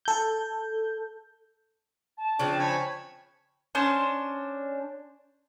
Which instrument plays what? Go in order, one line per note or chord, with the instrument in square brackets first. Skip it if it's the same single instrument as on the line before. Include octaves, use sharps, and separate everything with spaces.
[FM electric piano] A4 G6
[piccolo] A5
[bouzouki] C#3 F3 C4 [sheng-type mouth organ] D4
[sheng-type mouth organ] C#5 G#5 B5
[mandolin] C#4 D4 C5